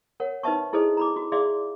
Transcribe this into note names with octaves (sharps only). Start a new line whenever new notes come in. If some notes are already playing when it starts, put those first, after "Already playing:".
A#4 C#5 F#5
D#4 B4 C5 E5 A5 C#6
E4 G#4 A4 C5 D#5
A#5 B5 D6
F#4
G#4 D5 E5 F5 C6 D6